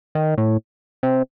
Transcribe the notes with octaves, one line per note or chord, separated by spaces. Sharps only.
D#3
A2
C3